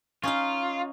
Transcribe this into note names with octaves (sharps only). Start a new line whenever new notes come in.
C#4 D#4 F4 F5